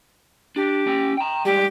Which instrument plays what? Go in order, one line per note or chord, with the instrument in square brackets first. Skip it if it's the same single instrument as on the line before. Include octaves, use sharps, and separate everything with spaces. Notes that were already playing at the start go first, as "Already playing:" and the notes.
[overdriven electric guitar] D4 [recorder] G4
[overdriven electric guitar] C#4 G5
G5 A#5
[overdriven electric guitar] G#2 G3 [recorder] G4